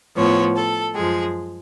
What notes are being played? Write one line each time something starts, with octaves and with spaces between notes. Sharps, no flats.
A2 F3 B3 C#5
A4
F#2 F3 G#3 G#4